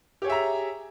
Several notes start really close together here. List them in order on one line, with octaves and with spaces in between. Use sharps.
G4 C#5 G#4 E5 A#5